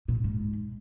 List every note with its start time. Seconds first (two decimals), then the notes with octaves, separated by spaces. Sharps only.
0.08 A#2
0.24 G#2